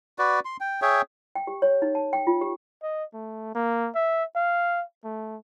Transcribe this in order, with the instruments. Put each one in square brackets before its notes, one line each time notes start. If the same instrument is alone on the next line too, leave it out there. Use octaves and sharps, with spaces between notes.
[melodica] F#4 B4 D5
C6
G5
G#4 C#5 E5 G5
[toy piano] G5
G4
C#5
D#4
A5
G5
F4
G4
[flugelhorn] D#5
A3
A#3
E5
F5
A3